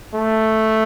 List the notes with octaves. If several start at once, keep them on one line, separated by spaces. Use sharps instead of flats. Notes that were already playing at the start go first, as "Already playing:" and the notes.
A3